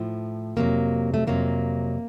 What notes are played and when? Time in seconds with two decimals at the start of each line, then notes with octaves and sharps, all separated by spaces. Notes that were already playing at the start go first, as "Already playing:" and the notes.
Already playing: A2 F3
0.57 F2 C3 F#3 A#3
1.14 A3
1.27 F2 C3 F#3 A#3